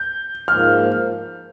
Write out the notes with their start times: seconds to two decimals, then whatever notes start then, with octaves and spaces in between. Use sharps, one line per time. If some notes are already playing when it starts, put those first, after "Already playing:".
Already playing: G6
0.48 G#2 F3 A#3 F6